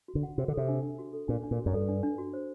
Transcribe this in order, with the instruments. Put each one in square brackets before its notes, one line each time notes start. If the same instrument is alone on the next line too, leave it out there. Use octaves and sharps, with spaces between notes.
[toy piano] F#4
[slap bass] D3
[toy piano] F#5
[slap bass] C3 [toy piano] F#4
[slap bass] D3
[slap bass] C3 [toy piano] A4
[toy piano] D4
D4
F#4
A4
[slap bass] A#2 [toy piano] D4
[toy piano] D4
[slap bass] A#2
[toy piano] F#4
[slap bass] F#2
[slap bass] G2 [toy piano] A4
[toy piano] D4
D4
F#4
C5